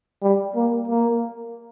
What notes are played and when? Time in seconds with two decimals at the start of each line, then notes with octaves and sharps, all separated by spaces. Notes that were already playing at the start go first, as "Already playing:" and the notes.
0.22 G3
0.56 A#3
0.88 A#3